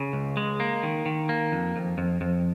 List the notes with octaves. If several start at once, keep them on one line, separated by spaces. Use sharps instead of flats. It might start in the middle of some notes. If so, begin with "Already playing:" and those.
Already playing: C#3
C#2
G#3
A#3
D#3
D#3
A#3
F2
F2
F2
F2